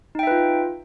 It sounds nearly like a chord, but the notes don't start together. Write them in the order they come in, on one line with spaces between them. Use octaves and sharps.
D#4 G5 E5 B4 F4